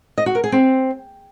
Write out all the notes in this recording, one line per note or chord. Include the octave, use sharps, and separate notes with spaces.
D#5
F#4
A#4
G#4
C4